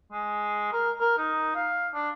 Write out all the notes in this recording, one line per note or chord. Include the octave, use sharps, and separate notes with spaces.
G#3
A#4
A#4
D#4
F5
D4